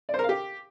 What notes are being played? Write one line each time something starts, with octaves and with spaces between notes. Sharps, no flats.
D5
C5
A#4
F5
G4